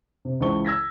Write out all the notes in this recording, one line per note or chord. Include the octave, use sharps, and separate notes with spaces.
C3
C#2 E3 C5 A5 C#6 G7
E6 G#6 A#6 B6